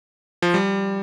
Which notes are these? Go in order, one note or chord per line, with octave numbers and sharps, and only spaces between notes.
F3
G3